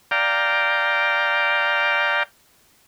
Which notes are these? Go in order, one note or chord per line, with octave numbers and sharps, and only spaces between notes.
D5 F5 G5 A#5